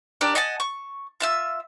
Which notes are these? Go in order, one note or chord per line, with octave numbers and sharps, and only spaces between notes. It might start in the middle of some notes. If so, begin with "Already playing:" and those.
D4 G4 A#4 D5
D#5 F#5 G#5 A5
C#6
F4 E5 E6